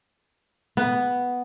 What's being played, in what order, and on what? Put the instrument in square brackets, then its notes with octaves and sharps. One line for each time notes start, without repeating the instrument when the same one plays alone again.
[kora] B3